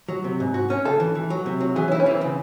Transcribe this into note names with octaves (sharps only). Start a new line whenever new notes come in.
F#3
C3
G#2
F#4
C#4
C#3 A4
E3
E3
F#3
C3
F#3
E3 G#4
C#4
C4 E4
C#4
E3 C4
C#3